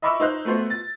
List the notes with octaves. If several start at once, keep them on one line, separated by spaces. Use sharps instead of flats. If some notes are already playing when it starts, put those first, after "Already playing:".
D#5 E5 B5 C#6 D6 E6
D#4 C5 F#6
A3 B3 F#4 C5
A6